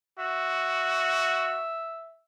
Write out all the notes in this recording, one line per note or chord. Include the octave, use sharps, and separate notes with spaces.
F#4 E5